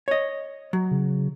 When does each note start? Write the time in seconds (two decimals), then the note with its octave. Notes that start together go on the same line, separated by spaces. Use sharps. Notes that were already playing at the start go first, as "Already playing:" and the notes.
0.08 C#5 D#5
0.73 F#3
0.91 C#3